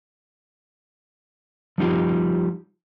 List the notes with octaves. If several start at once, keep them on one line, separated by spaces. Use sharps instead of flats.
F3 G3 D#4 F4 G4